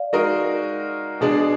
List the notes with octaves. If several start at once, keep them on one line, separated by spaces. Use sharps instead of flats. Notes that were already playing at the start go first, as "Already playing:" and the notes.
Already playing: D5 F5
G#3 D#4 F#4 A#4
B2 G#3 D4 G#4